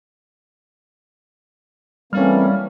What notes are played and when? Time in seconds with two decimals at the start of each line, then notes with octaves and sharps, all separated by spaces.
2.13 E3 G3 A3 A#3 C4 C#4 F6